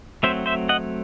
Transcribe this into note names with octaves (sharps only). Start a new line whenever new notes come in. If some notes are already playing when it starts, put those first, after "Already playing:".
F#3 A3 C4 C5 E5
C5 E5
D#5 F#5